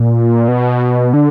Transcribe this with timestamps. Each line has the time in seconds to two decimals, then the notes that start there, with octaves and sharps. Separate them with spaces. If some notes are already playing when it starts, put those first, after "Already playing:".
Already playing: A#2
0.48 B2
1.14 D3